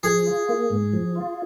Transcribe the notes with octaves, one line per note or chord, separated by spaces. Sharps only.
F3 G#4
F4
A#3
G#2
F3
F4